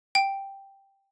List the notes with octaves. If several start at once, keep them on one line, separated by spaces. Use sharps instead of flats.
G5